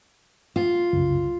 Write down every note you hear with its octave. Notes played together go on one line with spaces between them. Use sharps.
F4
C2 F#2 C#3